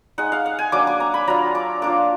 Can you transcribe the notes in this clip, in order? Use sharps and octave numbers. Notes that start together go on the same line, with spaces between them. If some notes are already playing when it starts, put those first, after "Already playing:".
G#3 D#4 F#5
F5
F#5
G#5
F#3 A#3 D4 D6
D6
A#5
B5
F#3 D4 F4 A#5
D6
A#3 D4 F4 D6